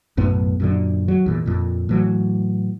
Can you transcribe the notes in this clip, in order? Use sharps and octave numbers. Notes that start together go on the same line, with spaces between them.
B1 F#2 A2 B3
F#2 A#2 D3
F#3
E2 A#2
F2 A#2
A2 E3 F#3